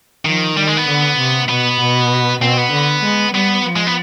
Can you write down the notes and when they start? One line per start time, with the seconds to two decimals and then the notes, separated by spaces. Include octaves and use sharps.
0.25 D#3 F3
0.56 D#3 G3
0.67 G#3
0.77 B3
0.88 D3
1.18 C3
1.49 B2 B3
1.81 B2
2.42 B2 C4
2.58 B3
2.72 D3
3.03 G#3
3.34 G3 B3
3.65 F3
3.76 G#3
3.87 B3